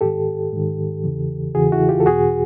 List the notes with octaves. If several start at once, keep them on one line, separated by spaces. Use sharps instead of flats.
G#2 D#3 G4 A4
G#2 D#3
E2 C#3 E3
E2 C#3 E3 F#4 G#4
E4 F#4
F4 G4
A4
E2 B2 F#4 G#4